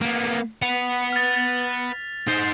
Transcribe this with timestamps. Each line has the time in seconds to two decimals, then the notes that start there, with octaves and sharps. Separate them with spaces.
0.01 A#3 B3
0.62 B4 F#5 F7
0.92 B6
1.13 F6 A6
2.27 D#4 C5